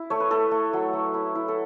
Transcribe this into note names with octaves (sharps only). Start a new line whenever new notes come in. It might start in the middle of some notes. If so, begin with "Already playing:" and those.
Already playing: E4
A3 C#5
B4
A3 A4
A3
F#3
F#3
E4
E4
A4